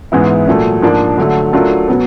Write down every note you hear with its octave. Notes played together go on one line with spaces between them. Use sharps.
G#2 E3 G#3 B3 E4
A#2 F#3 A3
G#2 F3 A#3 D4
D3 F#3 A3
F#3 A3 D4 F4 A#4
B2 F#3 B3